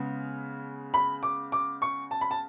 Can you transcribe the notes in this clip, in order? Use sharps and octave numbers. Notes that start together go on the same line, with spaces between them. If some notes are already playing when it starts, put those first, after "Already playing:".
Already playing: C#3 G#3 B3
B5
D6
D6
C#6
A5
B5
A5